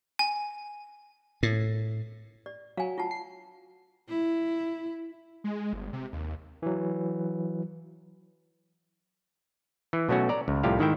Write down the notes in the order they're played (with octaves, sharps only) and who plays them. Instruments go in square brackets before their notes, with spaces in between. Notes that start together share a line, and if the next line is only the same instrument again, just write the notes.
[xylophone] G#5
[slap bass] A2
[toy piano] D5
[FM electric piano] F#3 [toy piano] F5 G#5
[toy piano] F4 F#5 A5
[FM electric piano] C7
[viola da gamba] E4
[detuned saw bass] G#3
G1
C3
D#2
[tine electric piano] E3 F#3
[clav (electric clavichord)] E3
B2 F#3 A3 C#4 F#4
D5 A#5
C#2
C2 A2 C3 F3 G4 F5
G#2 D#3 E4 E5 G5